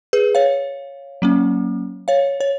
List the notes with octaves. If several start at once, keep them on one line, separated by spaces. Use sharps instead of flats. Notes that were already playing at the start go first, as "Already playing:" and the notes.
G#4 B4
C#5 F5
F#3 A#3 C#4
C#5 F5
C#5